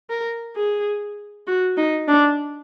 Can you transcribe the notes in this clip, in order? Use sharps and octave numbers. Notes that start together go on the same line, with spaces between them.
A#4
G#4
F#4
D#4
D4